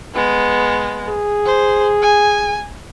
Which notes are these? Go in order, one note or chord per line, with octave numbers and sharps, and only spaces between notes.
G#3 B3
G#4
C5
G#5